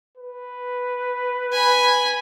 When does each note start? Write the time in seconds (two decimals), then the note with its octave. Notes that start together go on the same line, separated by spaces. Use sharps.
0.18 B4
1.52 G#5 B5